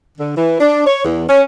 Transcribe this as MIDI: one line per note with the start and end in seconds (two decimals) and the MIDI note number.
0.19 0.35 50
0.36 0.60 52
0.61 0.84 62
0.86 1.04 73
1.05 1.23 40
1.28 1.41 61